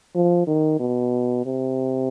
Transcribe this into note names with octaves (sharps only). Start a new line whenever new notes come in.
F3
D#3
B2
C3